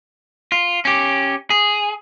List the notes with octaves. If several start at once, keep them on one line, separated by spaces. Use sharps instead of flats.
F4
C#4 G4
G#4